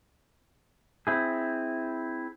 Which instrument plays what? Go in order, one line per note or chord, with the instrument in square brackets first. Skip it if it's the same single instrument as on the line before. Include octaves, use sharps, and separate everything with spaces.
[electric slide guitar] C4 E4 G#4